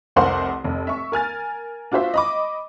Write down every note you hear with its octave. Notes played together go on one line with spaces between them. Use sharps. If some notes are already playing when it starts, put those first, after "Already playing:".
F1 C2 A#4 C5 F#5 C6
F1
E5 C#6
A#4 G#5 F6 A6
D4 F4 F#4 C5 E5
D#5 B5 D6